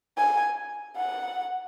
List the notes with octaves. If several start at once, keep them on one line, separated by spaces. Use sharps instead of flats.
G#5
F#5